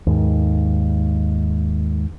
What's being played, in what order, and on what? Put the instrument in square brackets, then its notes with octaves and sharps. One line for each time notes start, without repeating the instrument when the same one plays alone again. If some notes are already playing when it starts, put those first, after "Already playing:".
[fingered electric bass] D#2 G#2